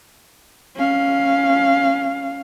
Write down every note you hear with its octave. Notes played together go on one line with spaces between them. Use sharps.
C#4 F5